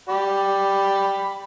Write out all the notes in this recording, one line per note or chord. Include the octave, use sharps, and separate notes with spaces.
G4 D5 B5